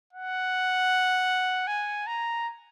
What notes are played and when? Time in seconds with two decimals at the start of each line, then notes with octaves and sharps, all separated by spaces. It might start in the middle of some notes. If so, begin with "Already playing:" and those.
0.13 F#5
1.67 G#5
2.07 A#5